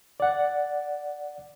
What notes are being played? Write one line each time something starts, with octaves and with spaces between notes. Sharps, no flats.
D5 F#5